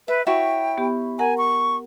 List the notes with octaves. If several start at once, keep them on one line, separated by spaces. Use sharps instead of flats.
B4 E5
E4 F#4 C#5 G5
B3 G4 B5
A#4 F#5 G#5 A#5
C#6